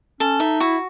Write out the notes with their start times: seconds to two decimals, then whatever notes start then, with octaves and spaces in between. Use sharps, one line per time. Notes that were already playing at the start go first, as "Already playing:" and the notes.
0.20 C#4 A4
0.40 D#4 E5
0.60 E4 F#4